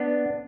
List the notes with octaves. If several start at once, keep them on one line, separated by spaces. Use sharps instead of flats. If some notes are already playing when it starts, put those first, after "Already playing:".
Already playing: B3 D4